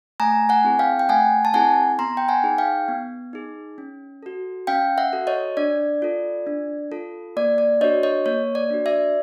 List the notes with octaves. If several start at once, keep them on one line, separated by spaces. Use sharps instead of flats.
A3 G#5 A#5
F#5 G#5
C4 E4 G#4
F5 G5
G5
A3 F#5 G#5
A5
C4 E4 G#4 F#5 G#5
B3 A#5 C6
G5
F#5 G#5
D#4 G#4
F5 G5
B3
D#4 G#4
C#4
F#4 A4
C#4 F5 G5
E5 F#5
F#4 A4
C#5 D#5
D4 D5
F4 A4
D4
F4 A4
A#3 D5
D5
D4 F#4 C#5 D#5
C#5 D#5
A#3 C#5
D5
D4 F#4
D5 E5